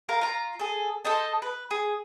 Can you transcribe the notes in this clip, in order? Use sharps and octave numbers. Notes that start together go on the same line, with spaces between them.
A#4 F5 A#5
F4 A#5
G#4 A4
A4 C5 D#5 A5
B4
G#4